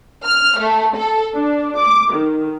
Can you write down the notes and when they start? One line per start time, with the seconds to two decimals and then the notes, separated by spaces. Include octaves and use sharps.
0.25 F6
0.59 A3
0.96 A4
1.34 D4
1.78 D6
2.12 D#3